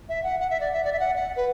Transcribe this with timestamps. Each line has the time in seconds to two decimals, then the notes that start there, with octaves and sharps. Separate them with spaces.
0.09 E5
0.23 F#5
0.40 F#5
0.50 E5
0.60 D5
0.72 E5
0.85 D5
0.93 E5
1.00 F#5
1.16 F#5
1.36 B4